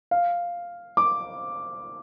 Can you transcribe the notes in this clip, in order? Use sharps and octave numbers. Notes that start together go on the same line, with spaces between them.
F5
D6